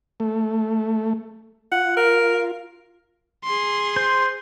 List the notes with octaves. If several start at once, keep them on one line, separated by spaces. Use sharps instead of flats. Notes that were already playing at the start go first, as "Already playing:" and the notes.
A3
F4 F#5
A#4
G#4 C6
C5